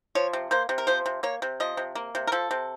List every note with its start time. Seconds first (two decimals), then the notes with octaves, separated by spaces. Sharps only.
0.15 F3 C#5
0.33 C3
0.51 A#3 C5
0.69 C3
0.78 A#4
0.87 F3 C5
1.06 C3
1.23 A#3 C#5
1.42 C3
1.60 F3 D#5
1.77 C3
1.95 A#3
2.15 C3
2.27 A#4
2.32 F3 A4
2.51 C3